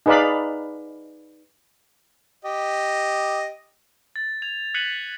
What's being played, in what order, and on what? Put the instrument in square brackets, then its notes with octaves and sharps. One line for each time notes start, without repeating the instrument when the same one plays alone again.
[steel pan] D#4 G#4 B4 D5 F5 B5
[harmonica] G4 D#5
[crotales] A6
G#6 F7
F#6 G#6 B6 C#7 D#7 F#7